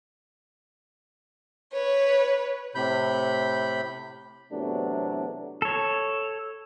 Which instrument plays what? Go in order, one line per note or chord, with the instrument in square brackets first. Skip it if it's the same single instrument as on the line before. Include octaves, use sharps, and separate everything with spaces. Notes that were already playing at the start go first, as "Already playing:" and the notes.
[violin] B4 C#5
[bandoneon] A2 C3 B5 G6
[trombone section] E2 A2 C3 F#3 B3 D4
[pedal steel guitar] A4 C#5